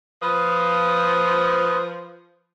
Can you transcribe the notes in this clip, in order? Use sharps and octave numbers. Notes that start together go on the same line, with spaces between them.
F3 B4 D#6